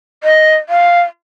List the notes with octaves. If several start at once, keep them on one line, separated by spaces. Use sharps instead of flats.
D#5
F5